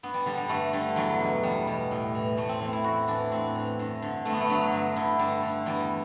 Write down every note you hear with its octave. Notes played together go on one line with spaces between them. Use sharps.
G2 B3
G3
D3 G3
G3
G2 A3
D3 G3
E2 F#3
B2
E2 G3
B2
A2
E3
A2 A3
C4
E3 C4
E4
A2 F#4
E3 D4
A2 C4
E3
G2
D3
G2 A3
B3
A3
D3 F#3
G2
D3 E4
G2 G3
D3
E2 G3